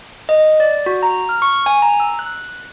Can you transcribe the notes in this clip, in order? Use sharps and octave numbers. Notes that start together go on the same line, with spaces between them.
D#5
D5
F#4
A#5
F6
C#6
G#5
A#5
E6
F#6